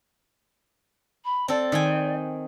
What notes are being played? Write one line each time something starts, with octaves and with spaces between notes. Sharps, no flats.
B5
C4 A4 D5
D#3 G5 G#5